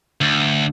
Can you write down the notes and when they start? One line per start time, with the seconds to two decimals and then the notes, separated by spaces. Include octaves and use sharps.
0.21 D2